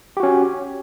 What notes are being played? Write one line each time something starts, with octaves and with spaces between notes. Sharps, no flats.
C#4 F#4 G4